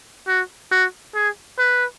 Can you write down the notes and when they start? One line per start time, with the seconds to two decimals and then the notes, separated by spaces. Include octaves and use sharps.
0.27 F#4
0.71 F#4
1.15 G#4
1.59 B4